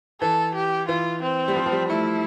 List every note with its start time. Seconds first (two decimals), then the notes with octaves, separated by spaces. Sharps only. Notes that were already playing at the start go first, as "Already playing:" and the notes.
0.21 E3 A4
0.55 G4
0.88 E3 F4
1.22 C4
1.48 G3
1.56 F3
1.66 F3
1.72 G3
1.89 A3 E4